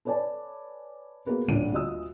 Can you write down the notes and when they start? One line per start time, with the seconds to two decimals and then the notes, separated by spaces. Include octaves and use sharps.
0.05 A4 B4 C#5 D5 G#5 A5
1.26 A#3 B3 F#4 G#4 A#4 B4
1.48 D#1 A1 D2 D3 D4 D#7
1.72 D2 F4 F#4 D#5 D#6 E6